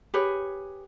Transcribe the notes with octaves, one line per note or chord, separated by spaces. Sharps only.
G4 G#4 B4 C#5